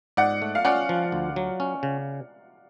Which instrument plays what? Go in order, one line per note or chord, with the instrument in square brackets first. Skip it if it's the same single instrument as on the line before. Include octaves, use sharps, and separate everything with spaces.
[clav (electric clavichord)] G#2 [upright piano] D5 F#5
[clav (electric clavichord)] A3
[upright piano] F5
[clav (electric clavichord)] C#4 [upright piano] D5 F#5
[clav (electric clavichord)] F3
D2
F#3
C#4
C#3